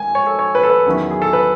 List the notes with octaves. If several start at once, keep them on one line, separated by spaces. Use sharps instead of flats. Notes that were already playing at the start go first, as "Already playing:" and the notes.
Already playing: G#3 G#5
C#5
A4
C#5
B4
A4
B4
E2 D#3 F#3 C#4 E4
G#4
A4
B4